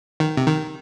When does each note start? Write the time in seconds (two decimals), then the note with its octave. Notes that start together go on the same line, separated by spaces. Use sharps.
0.20 D#3
0.37 C3
0.48 D#3